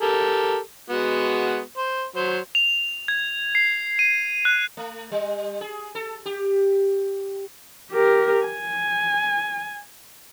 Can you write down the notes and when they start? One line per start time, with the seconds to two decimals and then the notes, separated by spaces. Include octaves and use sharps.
0.02 G4 A4 A#4
0.90 G#3 B3 F#4
1.77 C5
2.16 F#3 C5 C6
2.55 F7
3.08 G#6
3.55 C7
3.99 D#7
4.45 F#6
4.77 A3
5.11 G3
5.61 G#4
5.95 A4
6.26 G4
7.92 G4 A#4
8.46 G#5